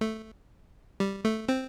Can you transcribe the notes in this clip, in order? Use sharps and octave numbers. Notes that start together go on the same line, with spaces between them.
A3
G3
A3
C4